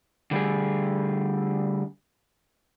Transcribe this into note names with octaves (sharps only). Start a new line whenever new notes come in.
D3 G3 A3 G#4